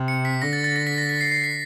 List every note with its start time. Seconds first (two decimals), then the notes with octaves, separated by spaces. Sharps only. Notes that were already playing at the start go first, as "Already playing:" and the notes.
Already playing: C3
0.08 C#7
0.25 B6
0.42 D3 A#6
0.53 A6
0.64 A6
0.76 A#6
0.87 B6
0.98 A#6
1.09 B6
1.21 C7
1.31 C7
1.44 B6